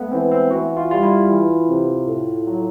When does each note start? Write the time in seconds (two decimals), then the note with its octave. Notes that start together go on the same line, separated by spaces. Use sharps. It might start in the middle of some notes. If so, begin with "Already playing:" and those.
Already playing: G#3 A3 B3
0.11 E3 C4
0.31 C4
0.51 E3 F#4
0.77 F4
0.90 G3 F4
1.03 E4
1.28 E3
1.68 C3
2.07 A2
2.45 F#3